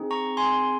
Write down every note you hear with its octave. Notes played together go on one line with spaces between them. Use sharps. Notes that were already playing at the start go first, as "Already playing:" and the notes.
Already playing: C4 D#4 G#4
A#5 C#6
G#5 C6